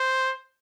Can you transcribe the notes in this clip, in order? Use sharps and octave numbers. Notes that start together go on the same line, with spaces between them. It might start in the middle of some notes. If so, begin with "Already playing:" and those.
Already playing: C5